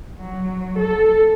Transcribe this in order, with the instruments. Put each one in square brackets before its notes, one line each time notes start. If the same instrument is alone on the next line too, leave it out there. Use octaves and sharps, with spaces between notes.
[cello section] F#3
A4